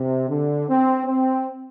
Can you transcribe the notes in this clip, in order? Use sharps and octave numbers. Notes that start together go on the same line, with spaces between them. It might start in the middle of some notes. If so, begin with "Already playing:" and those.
Already playing: C3
D3
C4
C4